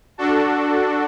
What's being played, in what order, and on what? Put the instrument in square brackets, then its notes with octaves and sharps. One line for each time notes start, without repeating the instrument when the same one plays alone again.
[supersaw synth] D4 F#4 A4